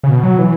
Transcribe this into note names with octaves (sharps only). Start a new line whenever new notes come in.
C#3
B2
F#3
E3